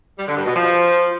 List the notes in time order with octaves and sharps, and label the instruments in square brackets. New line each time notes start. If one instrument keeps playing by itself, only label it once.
[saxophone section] G3
D3
G2
B2
F3